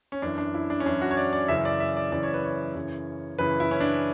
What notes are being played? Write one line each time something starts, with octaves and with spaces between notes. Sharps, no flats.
C#4
F#2 E3 D4
D4
E4
D4
C#4
F#2 E3 D4
F#4
C#5
D5
D5
F#2 C#3 E3 E5
D5
E5
D5
F#2 C#3 E3 D5
C#5
B4
C#5
F#2 C#3 E3
F#2 C#3 E3 B4
E4
C#4
D4